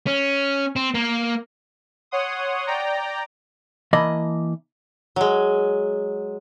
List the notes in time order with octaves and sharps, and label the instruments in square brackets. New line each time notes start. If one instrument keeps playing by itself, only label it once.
[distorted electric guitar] C#4
C4
A#3
[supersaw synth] C#5 F#5 C6 D#6
D5 G5 A#5
[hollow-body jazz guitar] E3 A#3 D#5 A5 B5
[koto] F#3 G#3